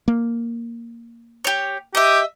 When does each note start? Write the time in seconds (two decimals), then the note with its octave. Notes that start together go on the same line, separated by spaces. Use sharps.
0.08 A#3
1.44 G4 C#5
1.95 G4 D#5 E5